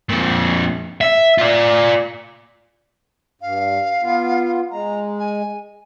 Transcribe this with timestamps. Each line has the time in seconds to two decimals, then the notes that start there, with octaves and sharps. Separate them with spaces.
0.09 F2 A#2
1.01 E5
1.38 F4 D5
3.42 G2 F5
4.01 B3 F4
4.71 G#3 A#5
5.19 G#5